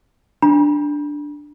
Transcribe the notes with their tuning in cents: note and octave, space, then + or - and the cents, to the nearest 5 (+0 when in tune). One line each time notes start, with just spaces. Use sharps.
D4 +0 B5 -45